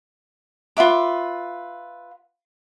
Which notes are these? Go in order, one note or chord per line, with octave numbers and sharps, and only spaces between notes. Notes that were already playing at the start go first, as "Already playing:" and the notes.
F4 B4 E5 D6